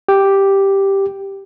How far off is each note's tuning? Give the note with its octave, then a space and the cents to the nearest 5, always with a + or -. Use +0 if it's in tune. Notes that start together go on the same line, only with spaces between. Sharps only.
G4 +0